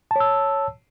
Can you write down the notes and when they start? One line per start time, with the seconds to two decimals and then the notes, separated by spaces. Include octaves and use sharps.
0.11 A5
0.16 C#5
0.20 E6